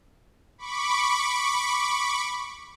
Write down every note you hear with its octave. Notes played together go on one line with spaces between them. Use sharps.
B5 C#6 D6